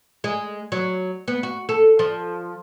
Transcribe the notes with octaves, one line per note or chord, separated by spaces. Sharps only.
G#3
F#3
B3
F#4
A4
F3